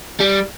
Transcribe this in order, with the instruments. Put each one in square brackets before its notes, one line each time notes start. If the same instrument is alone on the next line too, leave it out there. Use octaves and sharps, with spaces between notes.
[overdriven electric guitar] G3